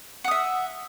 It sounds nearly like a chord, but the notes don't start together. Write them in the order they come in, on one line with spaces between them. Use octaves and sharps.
F#5 D#6 E5